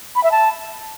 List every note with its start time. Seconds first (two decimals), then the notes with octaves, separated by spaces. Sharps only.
0.15 B5
0.24 E5
0.32 A5